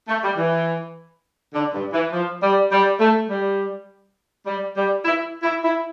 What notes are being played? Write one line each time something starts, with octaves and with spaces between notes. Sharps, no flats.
A3
G3
E3
D3
G2
E3
F3
G3
G3
A3
G3
G3
G3
E4
E4
E4